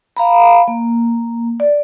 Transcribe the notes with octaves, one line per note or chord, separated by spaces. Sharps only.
F5 A#5 B5
A#3
D5